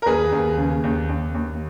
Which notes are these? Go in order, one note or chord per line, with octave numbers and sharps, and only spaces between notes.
A#4
D#2 G#4 B4
D#2
C#3
D#2
D#2
D#2